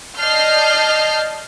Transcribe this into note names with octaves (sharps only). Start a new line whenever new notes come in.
D5 D#5 A5 F6 G6 C7